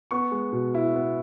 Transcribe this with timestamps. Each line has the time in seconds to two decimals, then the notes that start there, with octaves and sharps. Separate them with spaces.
0.11 B3 C#6
0.31 G#3
0.52 B2
0.74 E4
0.95 B3